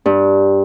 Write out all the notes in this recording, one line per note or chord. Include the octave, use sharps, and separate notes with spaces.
G2